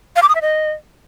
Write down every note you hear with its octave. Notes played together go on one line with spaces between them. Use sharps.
F5
D6
D#6
E5
D#5